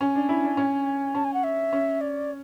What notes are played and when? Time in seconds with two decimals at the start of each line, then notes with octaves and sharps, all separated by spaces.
0.01 C#4 G#5
0.16 D4
0.29 E4
0.44 D4
0.57 C#4
1.15 C#4 A5
1.24 G#5
1.34 F#5
1.44 E5
1.73 C#4
2.01 D5